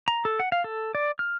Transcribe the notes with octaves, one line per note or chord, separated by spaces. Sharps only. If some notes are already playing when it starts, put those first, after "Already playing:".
A#5
A4
F#5
F5
A4
D5
F6